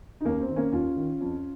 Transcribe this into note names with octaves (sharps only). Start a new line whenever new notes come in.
D#4
D#2 A#3 C#4
C4
D#3
A#3 C#4
D#2 C#4 F4
D#3
F2